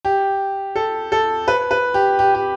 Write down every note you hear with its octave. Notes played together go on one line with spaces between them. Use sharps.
G4
A4
A4
B4
B4
G4
G4
G4